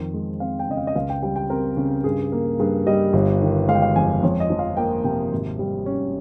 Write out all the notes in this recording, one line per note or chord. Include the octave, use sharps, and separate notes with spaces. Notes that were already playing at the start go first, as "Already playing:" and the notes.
Already playing: F2 D#3
G#3
C4 F5
G5
C#3 D#5
F5
D#5
C#2 F5
G5
G3 G5
G5
C4 A#4
C#3
G2 G#4
A#3
G2 G#4
G3 D#5
G1
D#3
G#3 F5
G5
F5
F2 G#5
F2 C#5
D#5
F3
F5
A#3 G5
C3 G5
G#1
G3
C#4